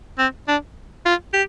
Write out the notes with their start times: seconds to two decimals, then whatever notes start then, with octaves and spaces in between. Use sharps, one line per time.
0.18 C4
0.48 D4
1.06 F4
1.33 G4